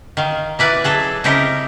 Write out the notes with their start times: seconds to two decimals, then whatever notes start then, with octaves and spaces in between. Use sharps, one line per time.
0.17 D#3 F5
0.59 A#3 E4 B4 D5
0.84 F#3 G#4 A4
1.24 C#3 C4 D#4 E4 G4 A#4